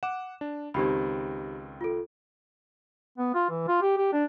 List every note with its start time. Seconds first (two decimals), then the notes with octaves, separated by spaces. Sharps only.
0.03 F#5 D6 E7
0.41 D4
0.74 C#2 D#3 C4 D#4 G4 B5
1.81 F4 A4
3.18 B3
3.34 F4
3.49 E3
3.68 F4
3.82 G4
3.97 G4
4.13 D4